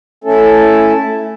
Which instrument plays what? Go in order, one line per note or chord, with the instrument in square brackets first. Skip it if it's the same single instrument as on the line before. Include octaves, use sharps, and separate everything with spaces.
[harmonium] A3 C#4 E4 A4